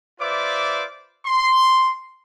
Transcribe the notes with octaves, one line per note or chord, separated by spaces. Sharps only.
F4 B4 C5 D5 E5 D6
C6